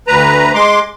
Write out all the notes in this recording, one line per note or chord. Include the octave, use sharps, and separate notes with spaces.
D2 B4 A#5
G#3 C6 D6